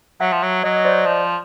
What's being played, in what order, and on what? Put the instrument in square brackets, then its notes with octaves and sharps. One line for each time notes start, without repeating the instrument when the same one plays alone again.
[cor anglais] F#3 [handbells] E5 F#5
[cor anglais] F3
F#3
[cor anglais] F#3 [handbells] C#5 D#5
[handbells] D#5
C5 D5
[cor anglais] F3